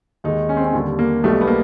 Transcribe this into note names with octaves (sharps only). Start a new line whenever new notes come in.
D#2 D#3 G#3 D#4
C#4
C4
C#4
D#2 D3 G3
A#3
B1 B2 G3 A3
B3
A#3